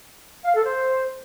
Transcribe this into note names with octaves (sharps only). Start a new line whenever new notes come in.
F5
A4
C5